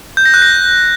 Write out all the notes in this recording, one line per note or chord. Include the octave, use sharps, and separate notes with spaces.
G6
A#6
F#6
A#6